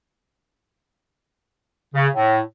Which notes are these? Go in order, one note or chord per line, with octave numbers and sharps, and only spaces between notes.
C#3
A2